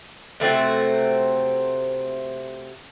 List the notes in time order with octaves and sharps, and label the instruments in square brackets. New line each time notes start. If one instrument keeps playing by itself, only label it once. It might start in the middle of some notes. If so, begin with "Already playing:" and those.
[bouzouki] C3 A3 C4 F#4